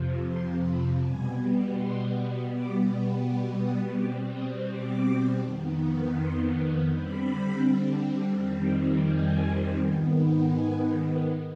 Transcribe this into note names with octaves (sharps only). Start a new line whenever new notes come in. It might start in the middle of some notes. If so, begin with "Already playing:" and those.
Already playing: F2 C3 F3
C6
B5
B2 G3 B3 G#5
C6
B2 G3 B3 D6
D6
D#6
B2 G3 C4 D6
D#6
D6
F2 D#3 B3
C6
D3 G3 C4 B5
F2 D#3 G3 C4
G#5
G#2 D#3 B3
G#5